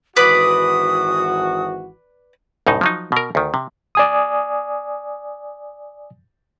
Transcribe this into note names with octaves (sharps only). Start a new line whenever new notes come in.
G#1 E3 F#4 B4 D5 D#6
C2 F#2 A2 D#4
F3 F#3 D#4
B2 A#4
D2 D#3
C3
D5 G#5 D#6